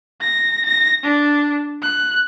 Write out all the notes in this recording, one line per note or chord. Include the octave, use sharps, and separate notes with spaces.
A#6
A#6
D4
F#6